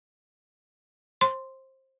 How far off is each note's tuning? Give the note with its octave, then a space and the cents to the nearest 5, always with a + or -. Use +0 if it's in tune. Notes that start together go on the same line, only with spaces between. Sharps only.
C5 +20 C6 -5